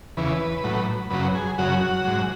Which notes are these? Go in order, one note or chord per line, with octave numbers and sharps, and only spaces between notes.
E2 C#3 E3 B4
A2 F#3
F#2 C#3 F#3 B4
G#4
F#2 C#3 F#3 F#4
G#2 F#3